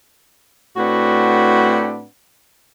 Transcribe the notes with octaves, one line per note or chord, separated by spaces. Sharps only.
A2 C4 D4 F#4 B4 F#5